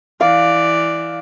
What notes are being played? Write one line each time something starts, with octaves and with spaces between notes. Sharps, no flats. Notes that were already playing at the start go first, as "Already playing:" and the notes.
E3 D5 F5